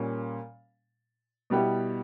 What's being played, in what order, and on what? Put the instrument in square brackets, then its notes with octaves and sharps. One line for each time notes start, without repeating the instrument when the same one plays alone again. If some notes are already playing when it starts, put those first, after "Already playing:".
Already playing: [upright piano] A#2 G3 C#4
B2 G3 B3 E4 G4